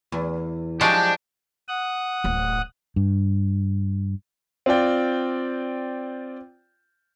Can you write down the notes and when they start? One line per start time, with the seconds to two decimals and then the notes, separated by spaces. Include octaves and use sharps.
0.12 E2
0.81 F3 F#3 G#3 D4 G4
1.68 F#5 D#6 F#6
2.24 D1 A1
2.96 G2
4.66 C4 F4 D5 G5